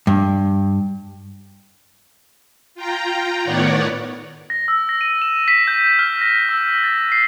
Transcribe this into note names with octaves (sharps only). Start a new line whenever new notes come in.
G2
F4 G5 A#5
A2 D#3 B3 C#5 D5 F#5
A#6
E6
A#6
D#7
E7
B6
G6
F6
A#6
E6
A6
C7